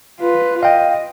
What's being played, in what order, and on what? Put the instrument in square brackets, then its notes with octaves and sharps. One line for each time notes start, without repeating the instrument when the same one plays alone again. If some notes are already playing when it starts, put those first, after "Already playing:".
[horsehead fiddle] F4 B4
[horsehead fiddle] D#5 [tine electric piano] F5 G5